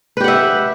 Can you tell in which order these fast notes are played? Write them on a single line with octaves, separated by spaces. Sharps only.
B4 G4 F#5 E5